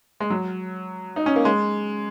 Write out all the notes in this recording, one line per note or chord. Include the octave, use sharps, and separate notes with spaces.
G#3
F#3
D#4
C#4
A#3
G#3